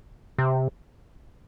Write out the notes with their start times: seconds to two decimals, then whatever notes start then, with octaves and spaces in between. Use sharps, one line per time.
0.38 C3